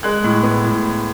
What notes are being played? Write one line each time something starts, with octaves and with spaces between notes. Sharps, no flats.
G#3 F#6
A2
B3
A2